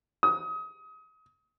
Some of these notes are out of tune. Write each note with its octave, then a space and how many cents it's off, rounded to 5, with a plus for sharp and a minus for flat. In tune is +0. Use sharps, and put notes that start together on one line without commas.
D#6 +30